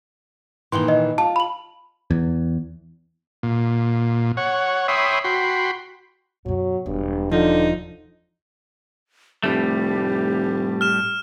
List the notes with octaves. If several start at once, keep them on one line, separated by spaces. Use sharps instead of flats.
A#2 D#3 E3 C6 G7
D#5
F4 A5
B5 F#7
E2
A#2
C#5 F#5
C#5 E5 G5 B5 C6 D#6
F#4 G5 B5 C6
F#2 B2 F#3
E1 G2
D3 F3 D#4
F1 A2 G3 A3 G4
F6 E7